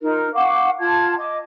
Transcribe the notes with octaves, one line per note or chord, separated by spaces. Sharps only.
D#4 F4 A#4
F5 F#5 C#6 D6
F4 A5 G#6
D#5 D6